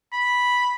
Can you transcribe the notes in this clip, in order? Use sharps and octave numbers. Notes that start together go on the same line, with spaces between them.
B5